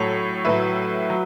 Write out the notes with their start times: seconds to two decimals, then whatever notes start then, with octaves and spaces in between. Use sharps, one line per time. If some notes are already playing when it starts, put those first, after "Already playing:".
Already playing: A2 F#3 A4 C#5
0.45 A2 F#3 B4 E5
1.10 F#3